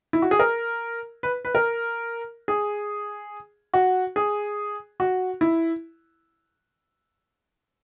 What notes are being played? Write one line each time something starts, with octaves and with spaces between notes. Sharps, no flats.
E4
F#4
G#4
A#4
B4
B4
A#4
G#4
F#4
G#4
F#4
E4